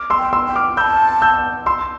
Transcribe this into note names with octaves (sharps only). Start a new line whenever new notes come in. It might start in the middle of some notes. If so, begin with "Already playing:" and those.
Already playing: D6 F6
C6 E6
G5
C6 E6
G5
D6 F6
A5 B5 E6 G6
E6 G6
C6 E6